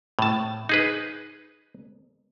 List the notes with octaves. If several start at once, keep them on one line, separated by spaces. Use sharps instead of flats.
A2 A5
D#4 G#4 B4